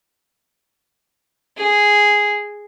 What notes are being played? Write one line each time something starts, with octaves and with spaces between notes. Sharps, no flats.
G#4